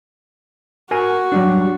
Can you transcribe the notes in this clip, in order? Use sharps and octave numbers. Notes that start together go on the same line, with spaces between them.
F#4 A#4 G#5
F#3 G3 D4